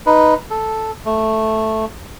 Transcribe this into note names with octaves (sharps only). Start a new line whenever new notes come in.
D#4 B4
A4
A3